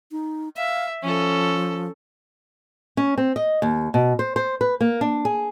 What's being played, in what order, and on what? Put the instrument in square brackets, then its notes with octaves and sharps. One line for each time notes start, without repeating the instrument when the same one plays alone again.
[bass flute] D#4
[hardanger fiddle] E5 [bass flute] F5
[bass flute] F3 [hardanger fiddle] C#4 A4
[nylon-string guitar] C#4
C4
D#5
D#2
B2
C5
C5
B4
A#3
D4
G#4